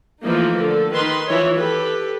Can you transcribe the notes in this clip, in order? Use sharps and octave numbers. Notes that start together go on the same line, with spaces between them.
E3 F3 A3 A#3 D#4
D3 A4
D#3 B4 C6
E3 F3 E4 C#5
G4 A4 B4